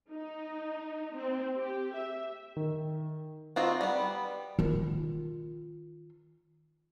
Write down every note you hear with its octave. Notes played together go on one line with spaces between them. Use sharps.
D#4
C4
G4
E5
D#3
C4 D#4 F4 F#4
G3 B3
D#3 F4